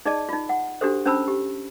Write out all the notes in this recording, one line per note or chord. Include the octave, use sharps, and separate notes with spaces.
D#4 G#4 D5 D#5 A5
D#4 F4
F#5
D4 F#4 G4 A4 C5
C#4 D4 C5 A5 B5 E6
G4